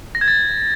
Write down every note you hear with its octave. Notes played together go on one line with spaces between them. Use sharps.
A#6
G#6
A6